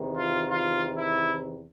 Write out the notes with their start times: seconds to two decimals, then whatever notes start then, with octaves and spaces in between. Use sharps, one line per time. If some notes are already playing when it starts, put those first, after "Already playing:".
Already playing: E2 C3 D#3
0.17 F4
0.49 F4
0.96 E4